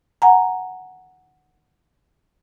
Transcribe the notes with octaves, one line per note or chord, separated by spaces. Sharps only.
F#5 G#5 A#5